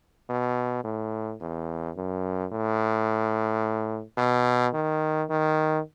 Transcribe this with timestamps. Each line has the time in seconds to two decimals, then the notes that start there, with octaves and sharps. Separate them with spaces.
0.30 B2
0.84 A2
1.41 E2
1.96 F#2
2.52 A2
4.17 B2
4.74 D#3
5.30 D#3